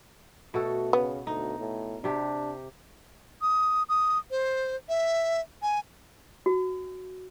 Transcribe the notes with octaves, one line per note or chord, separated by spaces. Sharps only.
B2 A3 F#4 A4
C#3 B3
D2 D#4
A2
C3 D4 G4
D#6
D#6
C5
E5
G#5
F#4